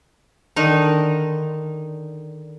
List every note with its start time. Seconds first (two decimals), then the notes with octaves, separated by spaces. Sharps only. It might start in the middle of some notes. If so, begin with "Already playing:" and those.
0.56 D3 D#3 D#4